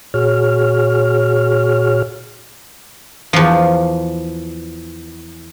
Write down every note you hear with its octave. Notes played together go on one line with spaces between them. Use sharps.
A#2 F#4 G#4 C#5 F6
E2 F3